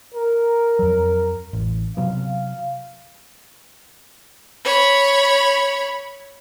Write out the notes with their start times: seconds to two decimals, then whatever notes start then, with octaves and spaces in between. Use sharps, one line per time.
0.14 A#4
0.79 F2 F#3
1.53 A1
1.97 C3 F#3 B3 F5
4.65 C#5 B5